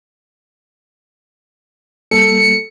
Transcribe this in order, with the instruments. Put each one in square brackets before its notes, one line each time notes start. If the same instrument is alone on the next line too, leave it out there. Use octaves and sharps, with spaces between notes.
[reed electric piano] G3 A#3 [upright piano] A4 [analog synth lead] C#7